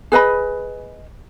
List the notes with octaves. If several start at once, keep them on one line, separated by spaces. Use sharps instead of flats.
G#4 B4 D#5 B5